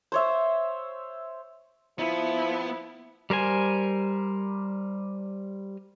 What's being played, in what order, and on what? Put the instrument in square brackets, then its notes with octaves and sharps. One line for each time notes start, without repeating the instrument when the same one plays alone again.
[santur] C5 C#5 E5
[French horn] F3 [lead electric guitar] B3 [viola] E4
[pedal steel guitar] G3 A#4 C5 G#5